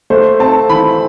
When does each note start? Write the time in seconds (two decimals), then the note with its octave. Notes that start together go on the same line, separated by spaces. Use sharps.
0.10 A3 C5
0.39 C4 A5
0.69 E3 B5